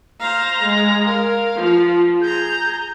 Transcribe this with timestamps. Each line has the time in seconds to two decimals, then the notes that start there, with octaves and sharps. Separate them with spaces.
0.20 C5 F5 A#5
0.63 G#3
1.06 A#4 F5
1.55 F3
2.22 G#4 A#5 G6